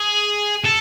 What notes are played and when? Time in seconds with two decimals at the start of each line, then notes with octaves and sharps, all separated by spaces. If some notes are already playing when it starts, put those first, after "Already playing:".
Already playing: G#4
0.65 A4